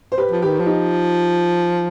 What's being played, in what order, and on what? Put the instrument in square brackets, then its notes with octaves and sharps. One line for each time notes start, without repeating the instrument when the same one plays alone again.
[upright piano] C5
G4 B4
[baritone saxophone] F3
[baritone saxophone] D#3 [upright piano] G4 B4
[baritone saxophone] F3
[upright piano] D#4 G4